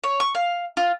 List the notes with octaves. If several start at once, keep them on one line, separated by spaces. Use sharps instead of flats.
C#5
C#6
F5
F4